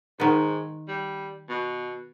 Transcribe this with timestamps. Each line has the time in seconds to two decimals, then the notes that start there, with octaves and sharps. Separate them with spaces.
0.20 G#2 D#3 B3
0.88 G3
1.49 B2